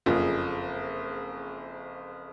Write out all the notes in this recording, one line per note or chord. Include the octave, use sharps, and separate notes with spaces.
F#1 F2 C#3